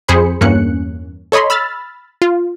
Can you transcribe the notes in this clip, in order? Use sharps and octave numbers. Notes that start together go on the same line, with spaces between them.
F2 G#4 C5 B5 C#7
E2 G2 A#3 C#4 F#6 C#7
A4 C#5 D#5 B5 C6
B5 E6 F6 A6
F4